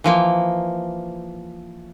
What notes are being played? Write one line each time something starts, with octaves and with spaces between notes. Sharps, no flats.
E3 F3 A#3